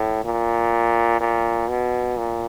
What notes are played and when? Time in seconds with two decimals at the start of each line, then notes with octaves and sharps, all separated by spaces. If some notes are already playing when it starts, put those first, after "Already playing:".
Already playing: A2
0.25 A#2
1.21 A#2
1.69 B2
2.17 A#2